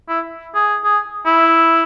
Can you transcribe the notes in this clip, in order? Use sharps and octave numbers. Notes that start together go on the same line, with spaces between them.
E4
G#4
G#4
E4